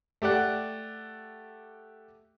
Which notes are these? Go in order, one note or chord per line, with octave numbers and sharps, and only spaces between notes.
A3 G4 D5 F#5